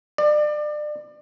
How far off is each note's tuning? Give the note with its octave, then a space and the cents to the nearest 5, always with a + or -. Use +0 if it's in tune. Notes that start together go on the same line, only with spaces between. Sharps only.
D5 +30